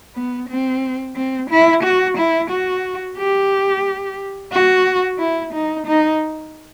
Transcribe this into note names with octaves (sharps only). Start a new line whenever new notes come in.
B3
C4
C4
E4
F#4
E4
F#4
G4
F#4
E4
D#4
D#4